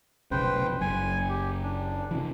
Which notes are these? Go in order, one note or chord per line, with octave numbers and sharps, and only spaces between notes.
F1 B1 C#3 B4 C5 G5
F#1 F#2 G#5
G4
D4
C3 E3